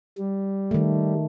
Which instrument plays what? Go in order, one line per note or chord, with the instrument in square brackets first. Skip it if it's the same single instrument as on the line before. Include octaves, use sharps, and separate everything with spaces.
[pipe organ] G3
[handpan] D#3 A3